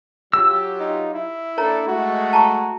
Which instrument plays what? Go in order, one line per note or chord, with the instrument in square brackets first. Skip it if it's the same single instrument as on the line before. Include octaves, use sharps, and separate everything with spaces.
[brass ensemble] F#3 F4 G4 [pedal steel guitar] E6
[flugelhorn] D#4
E4
[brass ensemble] A#3 D4 A4 [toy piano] C#5 A#5
[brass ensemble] G#3 A3 [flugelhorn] F#4
[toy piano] A5 A#5 C#6